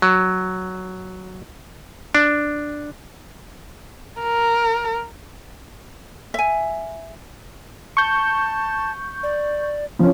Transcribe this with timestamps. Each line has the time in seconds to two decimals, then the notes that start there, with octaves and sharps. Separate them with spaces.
0.02 F#3
2.15 D4
4.22 A#4
6.34 E5 G#5
7.97 A5 C#6 G6
9.23 D5
9.99 F3 C#4